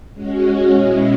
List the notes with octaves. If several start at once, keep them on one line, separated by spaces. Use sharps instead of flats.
G#3 C#4 F#4
B2 G#3 C#4 E4